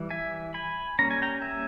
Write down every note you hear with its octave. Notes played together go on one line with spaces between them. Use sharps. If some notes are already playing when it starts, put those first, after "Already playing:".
Already playing: E3 G3
E5 G#5
G#5 B5
G3 A#3 C#4 A#5
G#5
G5 A#5
E5 G#5